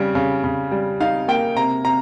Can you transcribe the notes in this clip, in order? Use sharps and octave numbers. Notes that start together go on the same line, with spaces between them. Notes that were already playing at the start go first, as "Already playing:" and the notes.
Already playing: C#3 G3
C#3
C#3
G3
D#4 F5
A#3 G5
C3 A#5
C3 A#5